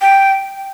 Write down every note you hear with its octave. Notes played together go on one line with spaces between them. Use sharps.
G5